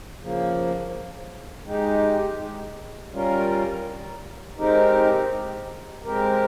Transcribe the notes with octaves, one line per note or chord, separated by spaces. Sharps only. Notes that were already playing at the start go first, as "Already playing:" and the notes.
C#3 F3 A#3
G#3 D#4 G4
G3 C#4 F4 A#4
G#3 C4 D#4 G4 A#4
G#3 C4 G4 A#4